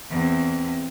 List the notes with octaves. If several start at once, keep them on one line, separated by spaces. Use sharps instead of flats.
E2 C4